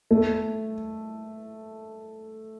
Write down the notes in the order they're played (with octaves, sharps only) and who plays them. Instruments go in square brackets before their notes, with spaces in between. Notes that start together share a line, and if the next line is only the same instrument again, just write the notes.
[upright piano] A3